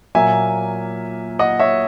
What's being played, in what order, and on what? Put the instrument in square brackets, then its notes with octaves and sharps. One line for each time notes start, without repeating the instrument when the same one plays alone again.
[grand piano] A#2 F#3 A#3 E5 G#5
D#5 F#5
C#5 E5